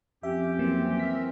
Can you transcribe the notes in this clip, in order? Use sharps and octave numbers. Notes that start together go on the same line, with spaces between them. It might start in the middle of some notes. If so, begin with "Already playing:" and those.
F2 C#4 G4 E5
E3 F#3 A#3 C4
A#4 E5 B6